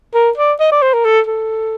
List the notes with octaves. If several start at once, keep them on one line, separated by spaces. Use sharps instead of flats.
A#4
D5
D#5
D5
C5
A#4
A4
A4